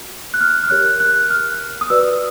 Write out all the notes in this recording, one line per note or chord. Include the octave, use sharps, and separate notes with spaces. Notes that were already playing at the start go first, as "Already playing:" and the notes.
Already playing: F#4
F#6
F6
F6
G4 A#4 C#5 F#6
F#6
F6
D#6
F#4 B4 D5 E6